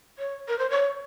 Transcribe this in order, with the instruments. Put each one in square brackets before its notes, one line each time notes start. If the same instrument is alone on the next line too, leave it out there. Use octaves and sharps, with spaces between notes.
[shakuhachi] C#5
A#4
C5
C#5